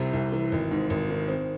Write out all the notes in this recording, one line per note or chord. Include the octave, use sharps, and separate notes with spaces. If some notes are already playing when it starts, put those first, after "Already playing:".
Already playing: C2 C3 G3
C2
E3
G#1
G#2
G#1
D#3
C4